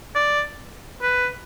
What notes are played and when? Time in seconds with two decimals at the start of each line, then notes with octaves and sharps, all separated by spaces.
0.15 D5
1.02 B4